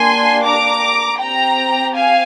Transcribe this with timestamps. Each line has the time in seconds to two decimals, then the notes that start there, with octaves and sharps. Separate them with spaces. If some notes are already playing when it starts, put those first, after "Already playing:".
Already playing: A#3 D4 G4 G#5 C6
0.45 A#5 D6
1.19 C4 G4 G5 A#5
1.93 F5 G#5